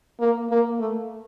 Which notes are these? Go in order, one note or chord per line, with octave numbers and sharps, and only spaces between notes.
A#3
A#3
A3